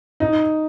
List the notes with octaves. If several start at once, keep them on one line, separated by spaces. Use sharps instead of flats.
D#4